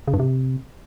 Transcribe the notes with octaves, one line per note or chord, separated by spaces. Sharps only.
C#3
G2
C3